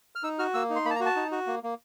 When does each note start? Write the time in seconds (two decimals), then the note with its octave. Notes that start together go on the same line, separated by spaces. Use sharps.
0.15 F6
0.23 D#4 E6
0.39 F#4 F6
0.54 A#3 E6
0.70 D#4
0.76 C6
0.85 A#3 B5
0.90 A5
0.95 A#5
1.00 F#4
1.06 A5
1.16 D#4
1.32 F#4
1.47 A#3
1.63 A#3